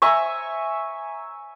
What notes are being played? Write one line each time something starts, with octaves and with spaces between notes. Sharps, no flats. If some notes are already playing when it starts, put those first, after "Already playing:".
E5 G#5 A#5 C#6